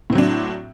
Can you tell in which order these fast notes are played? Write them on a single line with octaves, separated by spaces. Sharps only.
A2 C4 F#3 D4